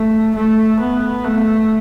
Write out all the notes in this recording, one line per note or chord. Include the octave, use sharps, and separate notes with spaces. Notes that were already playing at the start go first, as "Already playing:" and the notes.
Already playing: A3
A3
B3
A3